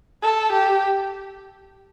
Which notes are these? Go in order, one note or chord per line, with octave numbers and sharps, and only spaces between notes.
A4
G4